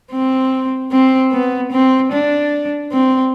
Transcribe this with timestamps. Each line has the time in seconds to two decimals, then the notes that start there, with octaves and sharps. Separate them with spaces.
0.12 C4
0.92 C4
1.32 B3
1.72 C4
2.12 D4
2.92 C4